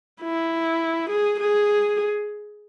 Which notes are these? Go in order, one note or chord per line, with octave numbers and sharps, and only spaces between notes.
E4
G#4
G#4